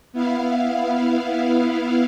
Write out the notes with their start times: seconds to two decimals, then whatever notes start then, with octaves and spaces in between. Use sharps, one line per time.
0.13 B3 E4 F5